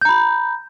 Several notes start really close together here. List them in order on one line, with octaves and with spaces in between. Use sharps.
G6 A#5 B5